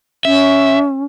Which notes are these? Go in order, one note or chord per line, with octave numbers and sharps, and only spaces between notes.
C#4 E5